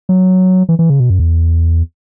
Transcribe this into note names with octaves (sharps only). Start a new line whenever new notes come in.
F#3
E3
E3
C#3
B2
F#2
E2